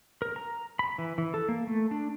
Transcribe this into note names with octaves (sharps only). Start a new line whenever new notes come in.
A#4
A#5
B5
E3
E3
A4
A#3
A3
D4